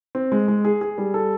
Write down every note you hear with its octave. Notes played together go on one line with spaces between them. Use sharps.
C4
G#3
G#3
G#4
G#4
G3
A4